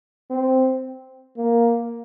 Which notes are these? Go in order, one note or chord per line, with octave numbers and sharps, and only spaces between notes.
C4
A#3